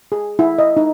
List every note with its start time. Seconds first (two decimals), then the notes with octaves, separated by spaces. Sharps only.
0.12 G#4
0.39 E4
0.59 D#5
0.77 D#4